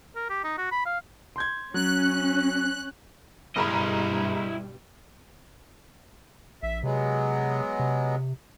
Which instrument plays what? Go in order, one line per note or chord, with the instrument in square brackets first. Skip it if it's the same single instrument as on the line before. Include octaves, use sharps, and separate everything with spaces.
[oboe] A#4
G4
D#4
F#4
B5
F5
[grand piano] C6 G6 G#6
[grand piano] F#3 [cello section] C#4 [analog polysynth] F#6
[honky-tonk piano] F#1 A#5 B5 [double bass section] G2 B2 G3 [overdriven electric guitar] E4 D#5
[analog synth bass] A#1 [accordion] E5
[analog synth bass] C3 [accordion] F#3 G#3 B3
[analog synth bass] C3